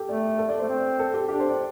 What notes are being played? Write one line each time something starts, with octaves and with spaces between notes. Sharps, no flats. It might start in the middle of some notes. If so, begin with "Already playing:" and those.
Already playing: G4 A4
A3 D5
A4
D5
A3 C5
C4
A4
G4
D4 G4
C5
D5